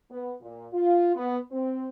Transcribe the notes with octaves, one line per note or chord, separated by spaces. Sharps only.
B3
A#2
F4
B3
C4